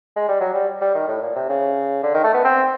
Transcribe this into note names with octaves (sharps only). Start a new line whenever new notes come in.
G#3
G3
F#3
G3
G3
D#3
A2
A#2
C3
C#3
D3
D#3
A3
B3
C4